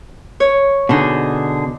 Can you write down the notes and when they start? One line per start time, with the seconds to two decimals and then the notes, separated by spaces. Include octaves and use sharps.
0.40 C#5
0.89 B2 D3 D4 D#4 G#4